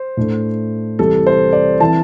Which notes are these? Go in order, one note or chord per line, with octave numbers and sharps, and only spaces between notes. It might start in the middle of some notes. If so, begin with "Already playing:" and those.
Already playing: C5
A2 A3 D4
C2 C3 E3 G3 C4 A4
C5
D5
E3 C4 E4 A5